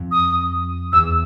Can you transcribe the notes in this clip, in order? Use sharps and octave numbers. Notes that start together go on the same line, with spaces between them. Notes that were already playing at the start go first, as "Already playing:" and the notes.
Already playing: F2
D#6
E2 E6